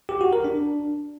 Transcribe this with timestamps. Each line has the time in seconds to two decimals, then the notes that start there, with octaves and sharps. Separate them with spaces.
0.09 G4
0.21 F#4
0.33 A#4
0.44 D4